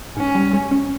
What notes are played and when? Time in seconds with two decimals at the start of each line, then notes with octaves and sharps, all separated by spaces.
0.16 G#2 C#4
0.35 G3
0.53 G#2
0.71 C#4